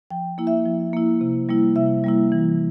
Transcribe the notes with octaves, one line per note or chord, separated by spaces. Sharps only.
F3 G5
A#3 E4
E5
F3
A#3 E4
C3
G3 A#3 E4
C3 E5
G3 A#3 E4
E3